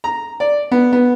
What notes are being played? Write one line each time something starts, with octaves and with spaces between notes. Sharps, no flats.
A#5
D5
B3
B3